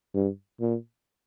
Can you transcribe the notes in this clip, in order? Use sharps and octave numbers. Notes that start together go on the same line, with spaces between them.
G2
A#2